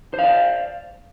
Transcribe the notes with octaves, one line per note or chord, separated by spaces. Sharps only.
C5 D5 F5